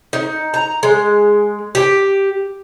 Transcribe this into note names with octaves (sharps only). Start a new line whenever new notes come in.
D#4
A#5
G#3
G4